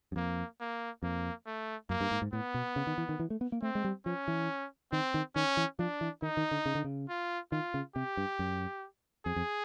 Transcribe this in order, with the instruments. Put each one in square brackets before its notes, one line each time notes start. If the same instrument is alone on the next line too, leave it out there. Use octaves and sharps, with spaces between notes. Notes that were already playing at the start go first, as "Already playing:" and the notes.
[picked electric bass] F#2
[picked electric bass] F2 [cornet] A#3
[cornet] A#3
[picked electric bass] F2 [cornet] A#3
[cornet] A3
[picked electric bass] F#2 [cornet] A#3
[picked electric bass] G2
G#2
G#2
[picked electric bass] A2 [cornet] B3
[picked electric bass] B2
C#3
D#3
E3
D#3
E3
A3
B3
A#3
[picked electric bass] A3 [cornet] C4
[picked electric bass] G#3
G3
[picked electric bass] F3 [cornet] C#4
[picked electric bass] E3
[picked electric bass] D#3 [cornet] C4
[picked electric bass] D#3
[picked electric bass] D#3 [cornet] C#4
[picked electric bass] E3
[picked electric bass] F3 [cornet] D4
[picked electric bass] E3
[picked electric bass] D#3 [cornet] D#4
[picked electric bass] D#3
D3
C#3
D3
C#3
[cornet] F4
[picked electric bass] D#3 [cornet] F4
[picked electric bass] C#3
[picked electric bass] C3 [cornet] G4
[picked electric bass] G2
F#2
[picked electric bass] F2 [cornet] G#4
[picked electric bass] F2